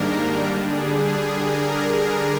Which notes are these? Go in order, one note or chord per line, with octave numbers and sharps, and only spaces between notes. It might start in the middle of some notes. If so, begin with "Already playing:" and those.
Already playing: G#2 D#3 G3 A#3 D4 A#4
D3 G3 D4 G#4
G#4
A#4